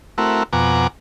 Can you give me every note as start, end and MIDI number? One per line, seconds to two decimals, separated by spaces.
0.18 0.43 57
0.18 0.43 60
0.18 0.43 64
0.18 0.43 66
0.18 0.43 70
0.53 0.87 41
0.53 0.87 47
0.53 0.87 78
0.53 0.87 80
0.53 0.87 82
0.53 0.87 86